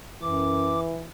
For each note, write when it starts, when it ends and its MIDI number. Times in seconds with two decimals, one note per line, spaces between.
0.22 0.83 42
0.22 1.07 52
0.22 0.80 86